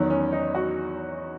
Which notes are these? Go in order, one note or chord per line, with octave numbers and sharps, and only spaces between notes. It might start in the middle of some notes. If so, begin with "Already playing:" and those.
Already playing: E2 D#3 F#3
C#4
D#4
F#4